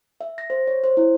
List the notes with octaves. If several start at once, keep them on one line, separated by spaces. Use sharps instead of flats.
E5
A#6
C5
C#5
C5
E4